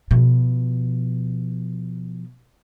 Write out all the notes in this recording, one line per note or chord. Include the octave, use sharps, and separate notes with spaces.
B2 F3